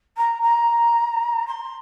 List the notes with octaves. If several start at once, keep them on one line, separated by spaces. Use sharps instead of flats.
A#5
A#5
C6